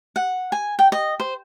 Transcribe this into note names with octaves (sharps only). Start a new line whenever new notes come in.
F#5
G#5
G5
D#5
C5